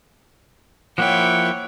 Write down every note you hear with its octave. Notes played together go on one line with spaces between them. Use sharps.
F3 A#3 E4 C#5 F#5 G5